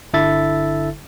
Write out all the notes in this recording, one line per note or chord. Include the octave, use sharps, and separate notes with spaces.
G1 D3 E4 A4 E5 A6